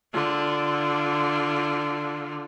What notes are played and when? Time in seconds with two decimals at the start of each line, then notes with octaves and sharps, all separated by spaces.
0.13 D3 F4